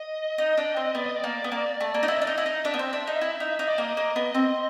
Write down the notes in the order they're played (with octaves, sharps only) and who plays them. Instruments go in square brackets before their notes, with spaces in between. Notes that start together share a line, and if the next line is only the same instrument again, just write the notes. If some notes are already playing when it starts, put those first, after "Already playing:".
Already playing: [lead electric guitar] D#5
[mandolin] D#4
D4
C4
[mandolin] B3 [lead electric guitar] D5
[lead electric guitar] D#5
D5
[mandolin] A#3
B3
A#3
A3
A#3
D#4
[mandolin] E4 [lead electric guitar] D#5
[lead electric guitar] D5
[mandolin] D4
[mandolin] D#4 [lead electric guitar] D#5
[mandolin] E4
D#4
[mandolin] D4 [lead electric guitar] E5
[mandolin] B3
C4
D4
D#4
E4
D#4
D#4
[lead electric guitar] D5
[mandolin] A#3 [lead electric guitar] D#5
[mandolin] A#3
B3
C4